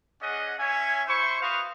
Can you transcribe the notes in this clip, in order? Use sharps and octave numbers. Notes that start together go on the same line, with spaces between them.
C#4 G#4 D5 D#5 F#5
C#4 C#5 E5 G#5
E4 C5 C#6
F#4 B4 C5 F5 C#6 D#6